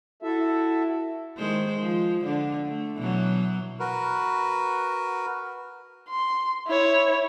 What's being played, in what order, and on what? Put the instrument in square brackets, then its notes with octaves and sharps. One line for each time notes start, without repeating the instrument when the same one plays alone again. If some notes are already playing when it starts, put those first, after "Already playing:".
[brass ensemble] E4 [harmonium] F#4 A4 E5
[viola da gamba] D#3 G#3 C5
F3
D3 D4
A3
B2 E3 F#3
[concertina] F#4 A#4 B4
[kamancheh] C6
E4 C#5